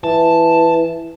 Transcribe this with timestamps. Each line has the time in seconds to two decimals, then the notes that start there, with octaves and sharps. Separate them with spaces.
0.04 E3 A5